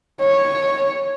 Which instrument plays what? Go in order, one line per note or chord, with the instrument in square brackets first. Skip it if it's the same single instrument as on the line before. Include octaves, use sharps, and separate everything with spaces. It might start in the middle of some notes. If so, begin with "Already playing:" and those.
[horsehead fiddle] C#5